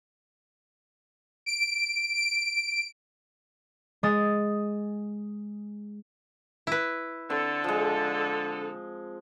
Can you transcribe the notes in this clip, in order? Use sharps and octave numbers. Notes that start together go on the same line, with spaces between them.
D7
D7
G#3 D#6 A6
E4 B4
D3 C4 A4
F3 G#3